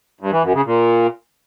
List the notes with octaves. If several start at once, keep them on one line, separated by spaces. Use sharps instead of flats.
G2
E3
F#2
C#3
A#2